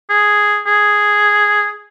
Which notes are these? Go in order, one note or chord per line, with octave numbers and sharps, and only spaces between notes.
G#4
G#4